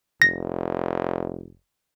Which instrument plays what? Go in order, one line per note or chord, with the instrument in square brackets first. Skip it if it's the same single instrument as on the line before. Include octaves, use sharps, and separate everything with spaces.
[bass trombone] F1 [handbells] A#6